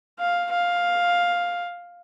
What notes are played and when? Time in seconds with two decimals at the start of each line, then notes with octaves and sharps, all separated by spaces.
0.19 F5
0.51 F5